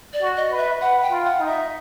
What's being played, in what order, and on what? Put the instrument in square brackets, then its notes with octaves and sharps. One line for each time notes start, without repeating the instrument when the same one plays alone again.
[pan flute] D5
[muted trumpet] F#4
[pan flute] D#5
[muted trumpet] B4
[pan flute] E5
[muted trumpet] B4 [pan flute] F#5
[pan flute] G5
[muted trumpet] F4
[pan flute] F#5
[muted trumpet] D#4
[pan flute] E5